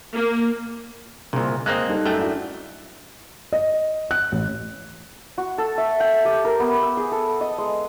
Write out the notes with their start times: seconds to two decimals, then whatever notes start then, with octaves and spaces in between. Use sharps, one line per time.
0.13 A#3
1.33 C2 A#2 C#3
1.66 G#3 A#3 C4 D#6 F#6
1.87 G3 D#4 A4
2.06 F#2 A3 G5
2.18 D4 E4 F#4
3.53 D#5
4.11 F#6
4.32 A1
5.38 F#4
5.58 A4
5.78 E5
6.00 G5
6.25 G4
6.45 A#4
6.60 B3
6.83 E6
6.97 G#4
7.12 A4
7.41 D#5
7.58 G#3